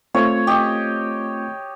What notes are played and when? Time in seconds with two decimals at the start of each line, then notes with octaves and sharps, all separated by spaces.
0.14 A3 C4 F4 C#5
0.47 G4 D#5